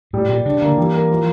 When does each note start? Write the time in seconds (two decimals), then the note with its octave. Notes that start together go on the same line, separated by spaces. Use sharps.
0.13 A2 G3
0.29 A#2 G3
0.45 C#3 D4
0.61 D3 A#3
0.77 E3 G3
0.93 A#4
1.11 F3